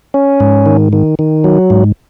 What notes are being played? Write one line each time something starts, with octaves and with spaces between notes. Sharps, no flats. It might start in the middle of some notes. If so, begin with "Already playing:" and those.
C#4
G#2
D#3
D#3
D#3
F#3
G#2